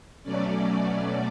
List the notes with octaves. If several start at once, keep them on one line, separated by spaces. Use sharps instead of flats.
B2 F#3 A3 C#4 D5